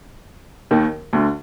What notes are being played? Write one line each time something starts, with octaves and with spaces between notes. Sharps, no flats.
D#2 D#3
D2 D3